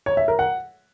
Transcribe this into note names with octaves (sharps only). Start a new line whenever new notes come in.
C#5
E5
A#4
F#5